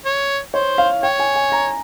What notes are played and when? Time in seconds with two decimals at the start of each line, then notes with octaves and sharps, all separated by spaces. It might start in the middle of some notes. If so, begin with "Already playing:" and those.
0.05 C#5
0.54 C5 C#5
0.78 F5
1.03 C#5 G5
1.20 G#5
1.36 G#5
1.52 A#5